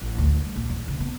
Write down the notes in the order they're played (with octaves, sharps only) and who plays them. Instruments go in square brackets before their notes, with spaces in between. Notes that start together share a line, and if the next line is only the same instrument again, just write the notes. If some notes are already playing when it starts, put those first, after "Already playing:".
[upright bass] A1
D2
G3
A#1
E2
C#3
B3